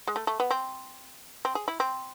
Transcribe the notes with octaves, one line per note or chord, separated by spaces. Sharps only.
G#3
A3
A3
B3
C4
C4
G#4
E4
C4